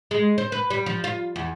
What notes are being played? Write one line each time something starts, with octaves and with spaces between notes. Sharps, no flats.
G#3
C5
B4
G3
F3
F4
E2